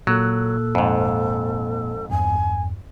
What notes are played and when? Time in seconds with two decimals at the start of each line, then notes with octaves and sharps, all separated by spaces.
0.07 A#2 F#3 A#3 A4 F#6
0.75 F2 G#2
2.10 E2 G2 G#5